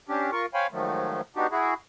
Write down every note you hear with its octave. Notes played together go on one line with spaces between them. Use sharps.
C#4 D4 G4
F4 A#4 C#6
C5 C#5 F5 G5 G#5 B5
G#2 D#3 F3 F#3 A3
B3 D4 D#4 F#4 G4
E4 F#4 G#4